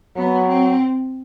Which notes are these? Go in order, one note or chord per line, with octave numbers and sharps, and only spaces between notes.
F#3 B3
C4